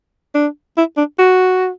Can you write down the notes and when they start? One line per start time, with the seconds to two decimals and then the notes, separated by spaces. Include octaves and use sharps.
0.35 D4
0.77 E4
0.97 D4
1.18 F#4